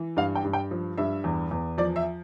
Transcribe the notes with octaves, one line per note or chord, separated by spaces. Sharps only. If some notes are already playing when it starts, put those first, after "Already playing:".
Already playing: E3
G2 F5
G5
G2
G5
F3
G2 E5
E2
E2
F3 D5
E5